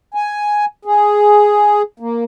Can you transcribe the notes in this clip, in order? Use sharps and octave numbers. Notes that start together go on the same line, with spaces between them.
G#5
G#4
A#3